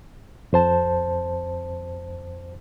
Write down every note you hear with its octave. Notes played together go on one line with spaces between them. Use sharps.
F2 C5 A5